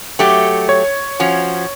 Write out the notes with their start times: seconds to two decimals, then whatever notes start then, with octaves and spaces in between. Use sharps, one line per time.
0.19 F#3 A3 G4
0.69 C#5
1.20 F3 C#4 F#4